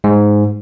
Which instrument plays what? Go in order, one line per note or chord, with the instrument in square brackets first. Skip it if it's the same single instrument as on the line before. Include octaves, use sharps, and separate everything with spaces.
[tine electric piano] G#2